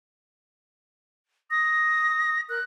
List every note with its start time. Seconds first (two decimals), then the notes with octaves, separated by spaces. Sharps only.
1.51 D#6 A#6
2.49 A#4 F#6